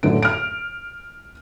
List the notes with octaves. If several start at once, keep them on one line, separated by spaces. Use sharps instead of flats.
F#2 A2 D3 D7
F6 D7